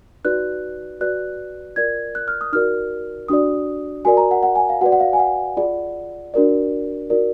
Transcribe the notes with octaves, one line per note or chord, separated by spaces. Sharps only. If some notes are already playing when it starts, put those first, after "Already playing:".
D#4 F#4 B4 D5 F#6
F#4 B4 D5 F#6
F4 A#4 D5 G#6
F#6
F6
D#6
D#4 F#4 A#4 D5 F6
D4 F#4 D5 D#6
F#4 A#4 D5 G#5
A#5
F#5
F#5
G#5
F5
F#4 B4 D5 F#5
F#5
F5
G#5
F#5
F4 G#4 D5
D4 F#4 A#4 D5
D#4 F#4 A#4 D5